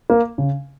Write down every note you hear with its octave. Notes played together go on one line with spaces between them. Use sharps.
A#3
C#3